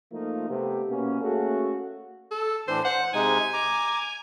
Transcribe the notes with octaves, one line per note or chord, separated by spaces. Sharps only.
F3 A3 A#3 D#4 F4
C3 A3 B3 C4 G4
B2 A#3 B3 C#4
A3 A#3 C#4 F#4 G#4 A4
A4
A2 E3 D4 C5
C5 F#5
C3 G#3 D#4 G#5
A#5 D6